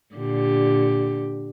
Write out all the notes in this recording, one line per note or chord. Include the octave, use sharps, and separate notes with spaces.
A#2 D3 G4